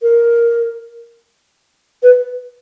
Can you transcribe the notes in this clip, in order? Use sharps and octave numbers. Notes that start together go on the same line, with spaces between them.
A#4
B4